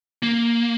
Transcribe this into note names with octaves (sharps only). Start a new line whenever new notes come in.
A#3